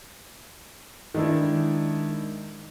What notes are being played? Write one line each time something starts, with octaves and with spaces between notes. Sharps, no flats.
D#3 G#3 D4 E4